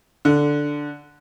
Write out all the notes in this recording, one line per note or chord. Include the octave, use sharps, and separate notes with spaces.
D3